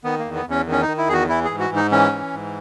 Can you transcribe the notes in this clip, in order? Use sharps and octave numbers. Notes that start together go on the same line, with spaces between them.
D#3 B3
A#3
E2
B3
E2 C#4
D#3
C#4
D#4
D#3
E4
E2 F#4 G#4
E3 E4
G#4
G#2
F#4
G#2
D#4
E3 C#4
E3
G#2